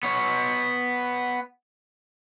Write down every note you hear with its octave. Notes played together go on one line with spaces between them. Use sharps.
B3 C#5